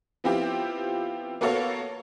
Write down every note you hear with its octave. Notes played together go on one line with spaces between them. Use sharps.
F3 B3 C4 E4 F4 G4
A#3 B3 F#4 A4 C#5 F5